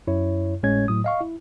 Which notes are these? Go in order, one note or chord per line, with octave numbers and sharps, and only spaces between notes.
F#2 E4 C#5
G#1 A2 G#3 C#4 C#5 G#6
A2 F#3 D#6
D#5 F5 C#6
E4